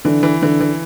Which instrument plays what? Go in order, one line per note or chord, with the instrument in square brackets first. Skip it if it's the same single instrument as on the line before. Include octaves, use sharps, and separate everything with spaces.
[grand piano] D3 [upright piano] E3
[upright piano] E3
[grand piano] D3 [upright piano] E3
[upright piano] E3